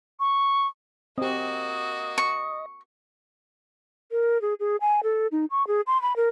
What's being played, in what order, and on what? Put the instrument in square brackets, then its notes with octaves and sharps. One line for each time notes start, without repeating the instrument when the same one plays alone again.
[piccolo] C#6
[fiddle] A#3 F#4 [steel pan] C4 G4 [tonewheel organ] D#5
[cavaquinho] C#6
[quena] A#4
G#4
G#4
G#5
A4
D#4
C#6
G#4
C6
B5
A#4